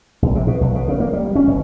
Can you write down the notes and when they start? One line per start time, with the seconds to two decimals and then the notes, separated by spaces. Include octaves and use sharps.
0.22 A#1
0.35 C3
0.47 B2
0.61 B1
0.75 B2
0.88 C#3
1.00 A#3
1.13 G3
1.35 C#4
1.47 G1